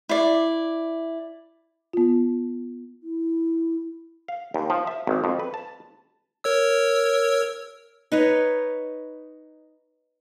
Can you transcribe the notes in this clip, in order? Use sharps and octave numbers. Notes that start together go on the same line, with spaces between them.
E4 D5
B3 F4
E4
F5
D#2
F3
E5
G#1
F2
B4
A5
A#4 C#5 E6
D#4 B4 C#5